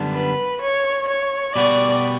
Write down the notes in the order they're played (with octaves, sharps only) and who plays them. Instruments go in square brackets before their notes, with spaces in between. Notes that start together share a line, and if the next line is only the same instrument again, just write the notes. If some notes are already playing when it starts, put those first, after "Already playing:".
Already playing: [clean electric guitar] F#2 D3 G3 B3 D4
[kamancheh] B4
C#5
C#5
[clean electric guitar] B2 G3 B3 F#4 [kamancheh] D5